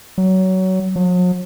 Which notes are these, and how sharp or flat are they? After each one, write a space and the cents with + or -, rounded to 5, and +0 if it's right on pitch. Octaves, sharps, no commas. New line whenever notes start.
F#3 +20
F#3 -45